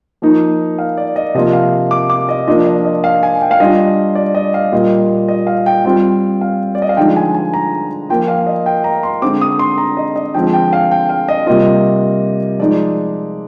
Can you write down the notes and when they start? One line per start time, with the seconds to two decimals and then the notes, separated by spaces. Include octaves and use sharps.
0.22 F3 A#3 D#4
0.79 F5
0.97 D5
1.16 D#5
1.35 C3 F3 A#3 F4 D#5
1.53 F5
1.91 D6
2.10 D6
2.29 D#5
2.47 F3 A#3 D4 F4 D#5
2.67 D#5
2.85 D#5
3.04 F5
3.23 G#5
3.42 G5
3.51 F5
3.60 G3 D4 F4 D#5
4.15 D5
4.35 D#5
4.54 F5
4.72 A#2 G3 A#3 F4 D#5
5.28 D#5
5.47 F5
5.66 G5
5.84 G3 C4 F4 G5
6.41 F5
6.75 D5
6.82 D#5
6.89 F5
6.97 D3 F3 G#3 D#4 G5
7.16 G#5
7.35 G#5
7.54 A#5
8.10 F3 A#3 F4 G5
8.28 F5
8.47 D#5
8.66 G5
8.84 A#5
9.03 C6
9.22 D3 G#3 C4 D6
9.41 D#6
9.59 C6
9.78 A#5
9.97 D#5
10.16 D#5
10.34 D3 F3 G#3 C4 G5
10.53 G5
10.73 F5
10.91 G5
11.09 F5
11.28 D#5
11.46 C3 G3 A#3 F4 D#5
12.59 F3 G#3 D#4 D5